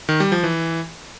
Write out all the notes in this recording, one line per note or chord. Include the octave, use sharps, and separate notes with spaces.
D#3
G3
F3
E3